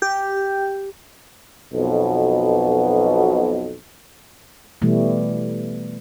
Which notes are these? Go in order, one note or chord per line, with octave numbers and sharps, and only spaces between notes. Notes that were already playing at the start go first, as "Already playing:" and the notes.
G4
B1 F2 B2
B2 E3 G3 A3